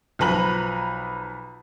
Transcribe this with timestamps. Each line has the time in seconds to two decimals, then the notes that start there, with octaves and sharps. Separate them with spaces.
0.19 B1 F3 B4 A#5 F#7